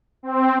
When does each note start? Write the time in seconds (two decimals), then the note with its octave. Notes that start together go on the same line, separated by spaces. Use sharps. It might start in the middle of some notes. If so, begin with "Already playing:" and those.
0.23 C4